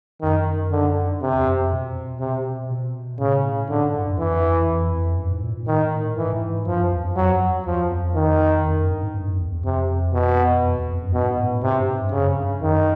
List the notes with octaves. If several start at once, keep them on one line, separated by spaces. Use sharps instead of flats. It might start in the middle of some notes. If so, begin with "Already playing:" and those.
F#2 D#3
D3
C3
E2
F2
F2
B2
C3
B2
A2 C#3
A2 D3
G#2
G2
F#2
F2 E3
F2
F2
F#2
G#2
A#2
A#2
A2 D#3
G#2 E3
A2
G#2
G2 F3
F#2
E2
F2
F2 F#3
F#2
E2 F3
F2
D#3
F2
F#2
G2
G#2
G2
F#2
E2
E2
F2 C3
B2
F2
E2
F2
F#2
G2 B2
G#2
A2
A2
G#2 C3
G2
G#2
G2
F#2 C#3
G2
F#2 D#3